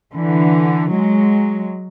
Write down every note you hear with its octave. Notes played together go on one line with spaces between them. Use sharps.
D3 E3
F#3 G#3